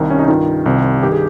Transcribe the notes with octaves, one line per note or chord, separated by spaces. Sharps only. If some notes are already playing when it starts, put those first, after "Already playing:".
Already playing: C2 C3 D#3
C#4
D#4
G2 D#3 F4
C2 C3 D#3
G2 D#3 G4
G#4